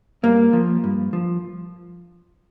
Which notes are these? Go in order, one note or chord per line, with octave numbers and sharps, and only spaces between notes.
G2 A#3
F3
G2
F3